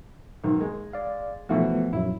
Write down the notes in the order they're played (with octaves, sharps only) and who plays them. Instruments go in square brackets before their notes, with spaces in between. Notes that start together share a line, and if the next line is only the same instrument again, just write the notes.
[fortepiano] B1 G#2 D#3
G#3
[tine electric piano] D5 F5
[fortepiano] B2 E3 F#4 [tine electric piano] F3 A3 B3
[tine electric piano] A#1 F#2 F#3 [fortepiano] E4